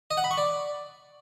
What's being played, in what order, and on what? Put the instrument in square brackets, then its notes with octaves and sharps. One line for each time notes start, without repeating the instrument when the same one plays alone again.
[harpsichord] D#5
F#5
B5
C#6
D5